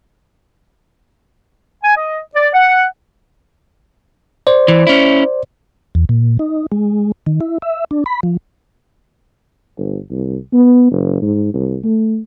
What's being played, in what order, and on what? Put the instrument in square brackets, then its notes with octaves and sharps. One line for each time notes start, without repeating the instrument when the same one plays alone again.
[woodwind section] G#5
D#5
D5
F#5
[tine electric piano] C5 D5
[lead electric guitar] E3
C#4 E4
[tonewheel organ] E2
A#2
D#4
G#3
D#3
E4
E5
D4
B5
F3
[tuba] G1
C2
B3
F#1
G#2
C2
A3